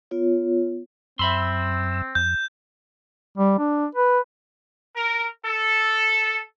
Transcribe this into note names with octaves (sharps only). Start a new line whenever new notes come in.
B3 F4 C#5
F#2 C4 E5 B5 C6 E6
F2 G6
G3
D4
B4
A#4
A4